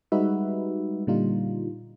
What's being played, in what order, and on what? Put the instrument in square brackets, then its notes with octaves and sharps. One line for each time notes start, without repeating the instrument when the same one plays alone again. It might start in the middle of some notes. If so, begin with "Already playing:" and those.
[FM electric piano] G3 G#3 D#4 F#4 B4 E5
A#2 D3 G3 D#4 F4